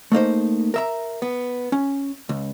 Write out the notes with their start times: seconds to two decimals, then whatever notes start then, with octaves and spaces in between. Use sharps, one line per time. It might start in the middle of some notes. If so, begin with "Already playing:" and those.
0.12 A3 A#3 D#4 C5
0.74 A#4 E5 A#5
1.22 B3
1.72 C#4
2.29 C#2